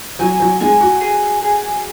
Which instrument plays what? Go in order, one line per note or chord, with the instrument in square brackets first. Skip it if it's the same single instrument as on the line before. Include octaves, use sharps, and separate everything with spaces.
[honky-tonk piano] F#3 [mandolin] G#5
[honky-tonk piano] F#3
[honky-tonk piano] G#3 [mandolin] G#5
[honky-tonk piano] F#4
[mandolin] G#4
G#4